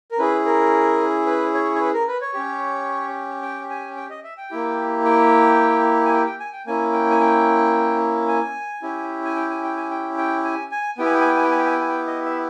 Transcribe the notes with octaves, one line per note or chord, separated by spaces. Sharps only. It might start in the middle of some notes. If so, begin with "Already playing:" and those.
A#4
C#4 E4 G#4 B4
A#4
B4
C#5
C#5
B4
A#4
B4
C#5
C#4 G4
G5
G#5
G5
D#5
E5
G5
A#3 E4 G4
G5
G#5
G5
G5
G#5
G5
A#3 C#4 E4 G#5
G5
G#5
G5
G#5
C#4 E4 G4
G#5
G5
G#5
G5
G#5
G5
G5
G#5
G#5
B3 E4 G4 G5
G#5
G5
G#5
G5
G#5
G5
G#5
G5
G#5
G5
G#5
G5
D#5
E5